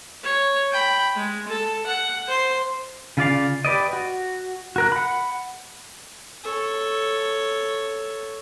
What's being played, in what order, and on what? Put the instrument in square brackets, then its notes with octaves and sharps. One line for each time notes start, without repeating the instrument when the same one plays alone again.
[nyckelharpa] C#5
G5 B5
G#3
A4
F#5
C5 C6
[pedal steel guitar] C#3 F4 D5 F5
G4 B4 D5 D#5
F#4
F#4 A#4 F#6
F#5 B5
[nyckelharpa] A4 C#5